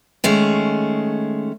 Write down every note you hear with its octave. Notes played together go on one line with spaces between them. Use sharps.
D#3 G#3 A3 C#4